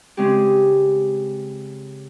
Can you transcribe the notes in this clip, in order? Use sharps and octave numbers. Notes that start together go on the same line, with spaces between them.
C#3 G#3 C4 G4